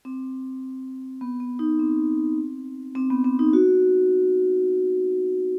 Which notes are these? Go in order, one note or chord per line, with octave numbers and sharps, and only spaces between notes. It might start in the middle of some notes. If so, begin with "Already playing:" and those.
C4
B3
B3
D#4
C4
C4
B3
C4
D#4
F#4